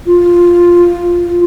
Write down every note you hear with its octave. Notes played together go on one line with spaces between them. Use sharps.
F4